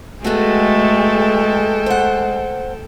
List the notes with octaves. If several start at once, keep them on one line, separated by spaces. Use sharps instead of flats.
G#3 A3 B3 F#4 G#4 A4 G5
C5 F#5